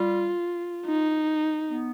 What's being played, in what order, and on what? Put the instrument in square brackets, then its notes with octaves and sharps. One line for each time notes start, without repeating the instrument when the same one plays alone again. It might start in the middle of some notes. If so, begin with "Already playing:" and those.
Already playing: [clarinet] G3 [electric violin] F4
[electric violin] D#4
[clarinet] B3